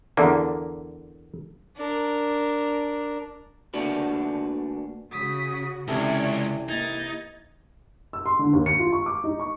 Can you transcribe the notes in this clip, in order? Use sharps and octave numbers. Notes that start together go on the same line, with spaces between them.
E2 D3 A#3
D4 A#4
A3 A#3 D4 F#4 B4
C#3 F#4 D#6 B6
C#2 C3 E3 C#4 A4 C#5 D5
A#3 D#4 E4 G#6 A6
E6
C6
D3
D#2
C#7
F4
C#6
D6
D#4
C#6